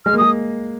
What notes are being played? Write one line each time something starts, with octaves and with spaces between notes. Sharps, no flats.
G#3 F6
A#3
G#3 D#6